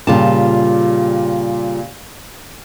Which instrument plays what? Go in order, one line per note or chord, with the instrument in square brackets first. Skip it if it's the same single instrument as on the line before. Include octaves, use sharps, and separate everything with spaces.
[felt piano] A#2 C#3 G4 [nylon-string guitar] G3 F4 A5